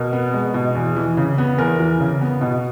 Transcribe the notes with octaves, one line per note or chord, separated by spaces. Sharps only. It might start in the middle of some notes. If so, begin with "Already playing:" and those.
Already playing: B2 A#4
B3
G#3
B2
E2
E3
C#3
B3
E2 A#4
E3
C#3
B3
B2